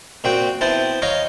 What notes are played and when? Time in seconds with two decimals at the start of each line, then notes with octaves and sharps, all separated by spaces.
0.24 A#2 C4 F#4 G5
0.61 B3 C4 E4 C5 A5
1.02 C#5 D#5 F5 A#5